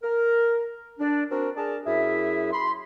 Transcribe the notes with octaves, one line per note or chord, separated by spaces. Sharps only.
A#4
D4
C4 D4 F#4 A#4
G#4 A#4 D5 A5
F#2 E4 G#4 E5
B5 C6